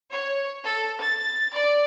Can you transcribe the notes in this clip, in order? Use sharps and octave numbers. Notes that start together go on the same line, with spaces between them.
C#5
A4
A6
D5